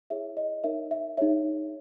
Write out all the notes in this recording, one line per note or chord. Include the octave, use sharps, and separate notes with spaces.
E4 G#4 C#5 E5
D#5
D#4 A#4 C#5 E5
E5
D#4 G#4 C#5 E5